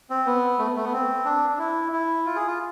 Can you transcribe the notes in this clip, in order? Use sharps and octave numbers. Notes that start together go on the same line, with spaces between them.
C4
B3
A3
A3
B3
C4
D4
D4
E4
E4
F4
G#4
F4